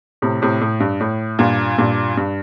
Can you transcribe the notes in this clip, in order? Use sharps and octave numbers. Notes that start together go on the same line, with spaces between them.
A2 C3
A2 C3
A2
G2
A2
G2 A#2
G2 A#2
G2